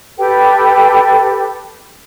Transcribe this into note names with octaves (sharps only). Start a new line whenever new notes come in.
G4 A4 B4 G5